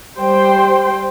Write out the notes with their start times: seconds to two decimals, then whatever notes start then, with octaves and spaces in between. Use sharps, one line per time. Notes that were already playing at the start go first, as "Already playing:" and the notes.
0.19 G3 C5 G5 C6